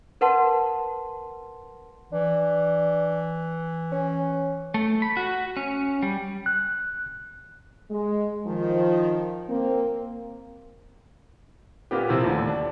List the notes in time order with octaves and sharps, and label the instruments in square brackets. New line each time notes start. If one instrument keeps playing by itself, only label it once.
[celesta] A#4 B4 F#5 A5 C6
[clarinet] E3 [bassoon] D4
[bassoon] C#4
[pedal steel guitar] A3
B5
F#4
C#4
G3
[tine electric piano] F#6
[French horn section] G#3
D#3 F3
A#3 C4
[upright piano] A#2 A#3 B3 G4
C3 F3 C4 E4
D#2 A2 D3
D4